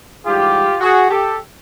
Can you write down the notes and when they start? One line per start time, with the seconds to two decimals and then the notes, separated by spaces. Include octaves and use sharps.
0.24 G#2 E3 G3 F4 G4
0.81 F#4 G#4
1.09 G4 A4